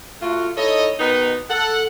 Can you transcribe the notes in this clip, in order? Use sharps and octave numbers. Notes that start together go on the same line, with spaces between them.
A3 F4 F#4
D#4 E4 A4 C#5 D#5
B2 D#3 B3 D#4
A4 F#5